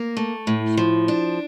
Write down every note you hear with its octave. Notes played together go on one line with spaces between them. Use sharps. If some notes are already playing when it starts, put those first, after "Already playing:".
Already playing: A#3
A3
A2
F3
D4